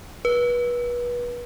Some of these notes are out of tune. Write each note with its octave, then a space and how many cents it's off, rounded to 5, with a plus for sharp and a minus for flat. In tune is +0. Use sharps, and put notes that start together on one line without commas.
B4 -30